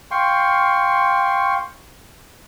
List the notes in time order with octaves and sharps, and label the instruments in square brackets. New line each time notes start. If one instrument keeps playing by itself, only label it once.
[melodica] F5 G5 C6 C#6